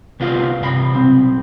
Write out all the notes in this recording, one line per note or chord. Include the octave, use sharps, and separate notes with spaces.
C2 B3 F4 F5
G2 C3 F5 B5
B1 C4